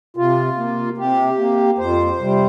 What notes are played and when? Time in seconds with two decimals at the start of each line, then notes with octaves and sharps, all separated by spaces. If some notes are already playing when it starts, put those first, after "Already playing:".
0.17 C3 F4
0.57 A#3
0.97 C3 G4
1.39 A#3
1.78 F2 C5
2.19 C3 G3